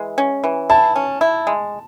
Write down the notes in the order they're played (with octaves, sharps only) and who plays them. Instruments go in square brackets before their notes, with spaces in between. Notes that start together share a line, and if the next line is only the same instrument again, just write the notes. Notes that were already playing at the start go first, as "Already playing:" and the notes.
Already playing: [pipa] E3 G#3
C#4
E3
[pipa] E4 [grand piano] A5
[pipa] C#4
E4
G#3